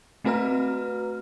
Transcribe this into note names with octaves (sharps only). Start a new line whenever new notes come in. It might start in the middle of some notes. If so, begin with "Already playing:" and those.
A3 C4 F#4 B4 A#5 F6